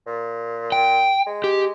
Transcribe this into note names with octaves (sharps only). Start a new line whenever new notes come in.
A#2
G5
G#3
G4